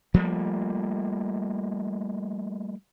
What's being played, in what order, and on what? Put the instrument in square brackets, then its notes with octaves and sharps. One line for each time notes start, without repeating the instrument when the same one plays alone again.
[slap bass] F3 G3 A3 A#3